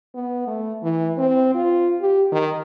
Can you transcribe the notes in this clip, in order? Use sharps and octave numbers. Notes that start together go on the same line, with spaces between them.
B3
A3
E3
C4
F4
G4
D#3